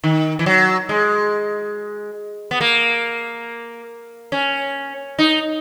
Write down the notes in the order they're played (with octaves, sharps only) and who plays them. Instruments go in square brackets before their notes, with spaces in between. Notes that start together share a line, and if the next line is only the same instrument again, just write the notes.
[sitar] D#3
E3
F#3
G#3
B3
A#3
C#4
D#4